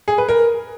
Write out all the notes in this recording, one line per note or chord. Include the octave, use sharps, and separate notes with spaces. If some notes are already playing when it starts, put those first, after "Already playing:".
G#4
B4
A#4